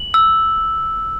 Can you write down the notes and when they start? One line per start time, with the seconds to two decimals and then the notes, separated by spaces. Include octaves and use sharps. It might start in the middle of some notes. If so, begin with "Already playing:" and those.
Already playing: F#7
0.14 E6